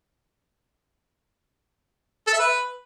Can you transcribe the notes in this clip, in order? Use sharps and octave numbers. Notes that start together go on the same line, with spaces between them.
A4
E5
B4